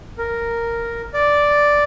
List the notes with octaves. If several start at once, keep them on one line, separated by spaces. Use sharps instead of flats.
A#4
D5